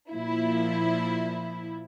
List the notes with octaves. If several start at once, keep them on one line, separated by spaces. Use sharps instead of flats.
A#2 F3 E4